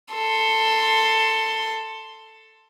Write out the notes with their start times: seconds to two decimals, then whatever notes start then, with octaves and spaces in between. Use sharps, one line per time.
0.13 A4 C6